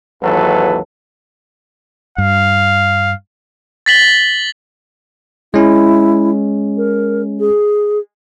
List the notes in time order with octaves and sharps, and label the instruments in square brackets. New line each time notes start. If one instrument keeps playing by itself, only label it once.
[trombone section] G#1 D#2 E3 F#3 A4 B4
[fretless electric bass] G2 [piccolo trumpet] F5
[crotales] A6 B6 F#7 G7
[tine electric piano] G#3 C#4 [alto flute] E4
[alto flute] A#4
G#4